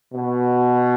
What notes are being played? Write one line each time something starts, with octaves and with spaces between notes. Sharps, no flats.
B2